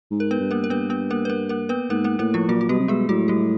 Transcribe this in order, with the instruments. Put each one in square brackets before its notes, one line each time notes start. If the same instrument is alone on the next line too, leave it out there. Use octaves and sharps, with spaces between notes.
[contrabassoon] G#2
[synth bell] A#4
B3 B4
[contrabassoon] G2
[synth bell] A#3 A#4
A#4
[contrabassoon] G2 [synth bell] B3 B4
[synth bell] B3 B4
A#3 A#4
B4
A#3 A#4
A#3 A#4
B3 B4
[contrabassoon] G#2 [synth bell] A#3 A#4
[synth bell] A#3 A#4
[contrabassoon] A2 [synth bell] A#3 A#4
[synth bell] F3 F4
[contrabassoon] A#2 [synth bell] F#3 F#4
[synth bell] F#4
[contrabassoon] B2 [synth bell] G3 G4
[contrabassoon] C3
[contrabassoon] B2 [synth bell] G#3 G#4
[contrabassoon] A2 [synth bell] F#3 F#4
[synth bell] G3 G4